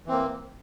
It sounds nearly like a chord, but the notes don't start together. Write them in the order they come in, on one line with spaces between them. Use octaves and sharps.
E3 C4 A#3